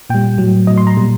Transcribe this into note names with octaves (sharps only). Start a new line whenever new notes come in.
A#2 G3 G5
A2 F#3
A2 F#3 D#5
C6
A#5
A#2 G3